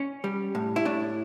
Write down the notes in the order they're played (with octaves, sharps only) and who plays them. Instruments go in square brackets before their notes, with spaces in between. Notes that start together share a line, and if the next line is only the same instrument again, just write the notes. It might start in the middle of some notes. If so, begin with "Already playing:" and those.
Already playing: [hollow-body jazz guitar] C#4
G3
A2
E4
A2 D4